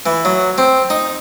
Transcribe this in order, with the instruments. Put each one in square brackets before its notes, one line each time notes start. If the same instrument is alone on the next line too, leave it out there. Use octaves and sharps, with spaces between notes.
[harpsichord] E3
F#3
C4
D#4